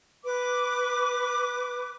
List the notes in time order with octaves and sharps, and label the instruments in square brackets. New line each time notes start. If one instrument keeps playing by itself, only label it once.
[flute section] B4 D6